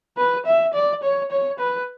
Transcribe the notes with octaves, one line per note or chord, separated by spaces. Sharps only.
B4
E5
D5
C#5
C#5
B4